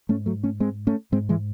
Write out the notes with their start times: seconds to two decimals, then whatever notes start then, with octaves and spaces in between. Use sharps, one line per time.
0.09 G#2 A3 C#4
0.26 F#3 A3
0.43 A3 C#4
0.60 G#3 C4
0.87 A3 C#4
1.12 G#2 G#3 C4
1.29 E3 G#3